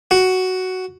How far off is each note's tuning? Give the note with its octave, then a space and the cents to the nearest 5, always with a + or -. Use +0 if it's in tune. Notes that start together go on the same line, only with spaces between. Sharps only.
F#4 +5